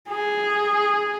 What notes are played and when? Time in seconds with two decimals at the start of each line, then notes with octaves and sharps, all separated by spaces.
0.10 G#4